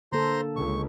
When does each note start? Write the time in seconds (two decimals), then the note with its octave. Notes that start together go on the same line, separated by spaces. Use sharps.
0.12 D3 A#3 A4 C5 A#5 C6
0.56 C#2 C#6